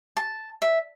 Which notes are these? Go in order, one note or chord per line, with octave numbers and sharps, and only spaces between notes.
A5
E5